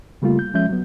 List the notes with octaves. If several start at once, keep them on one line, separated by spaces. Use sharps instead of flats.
C#3 G3 A3 A#3 F4
G6
F3 G#3 C#4 E5 G6
F#3 B3